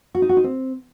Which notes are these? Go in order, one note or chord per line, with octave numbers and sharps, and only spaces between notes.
F#4
D#4
F#4
D#4
C4